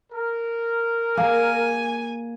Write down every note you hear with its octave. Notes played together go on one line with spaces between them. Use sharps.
A#4
A#3 G#4 G#5